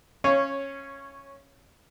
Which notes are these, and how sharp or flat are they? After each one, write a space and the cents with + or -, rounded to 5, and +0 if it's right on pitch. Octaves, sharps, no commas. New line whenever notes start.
C#4 -15 C#5 +0 F5 -20